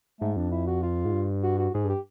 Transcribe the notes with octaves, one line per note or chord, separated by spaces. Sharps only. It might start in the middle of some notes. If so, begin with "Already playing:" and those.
G#2 A3
F2 D4
E4
F#4
F4
G#2
G2
F#4
F#4
G#2 G#4
G2
G4